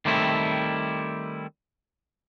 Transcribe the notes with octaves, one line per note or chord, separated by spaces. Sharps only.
D#3 G3 A3 C4 E4